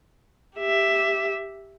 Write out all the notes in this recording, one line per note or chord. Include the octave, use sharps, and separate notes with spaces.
G4 E5